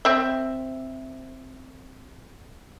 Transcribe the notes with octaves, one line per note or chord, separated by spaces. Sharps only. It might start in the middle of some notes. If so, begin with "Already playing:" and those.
C4 E5